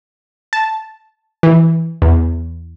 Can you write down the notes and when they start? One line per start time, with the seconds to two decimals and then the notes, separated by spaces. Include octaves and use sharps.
0.53 A5
1.43 E3
2.02 E2